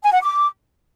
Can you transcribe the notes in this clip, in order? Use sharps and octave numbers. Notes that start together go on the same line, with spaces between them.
G#5
F#5
D6